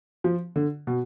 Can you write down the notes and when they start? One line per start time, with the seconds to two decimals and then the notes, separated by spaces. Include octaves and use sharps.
0.24 F3
0.56 D3
0.87 B2